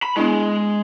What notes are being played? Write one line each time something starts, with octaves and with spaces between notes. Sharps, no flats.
B5
G#3 B3 D4 E4